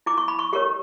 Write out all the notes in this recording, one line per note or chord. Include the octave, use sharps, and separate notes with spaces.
E4 D6
C#6
B5
C#6
G4 A#4 C#5 C#6